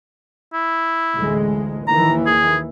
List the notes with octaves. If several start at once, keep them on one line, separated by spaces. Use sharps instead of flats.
E4
A1 D2 G#3
D#2 D#3 E3 A#5
G#4